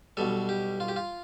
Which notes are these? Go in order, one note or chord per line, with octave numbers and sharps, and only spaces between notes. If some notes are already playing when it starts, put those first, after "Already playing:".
B1 B2 G3 A4
G4
F4
G4
F4